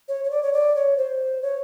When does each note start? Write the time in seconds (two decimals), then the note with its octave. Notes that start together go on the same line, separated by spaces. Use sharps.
0.08 C#5
0.24 C#5
0.31 D5
0.43 C#5
0.53 D5
0.76 C#5
0.97 C5
1.42 C#5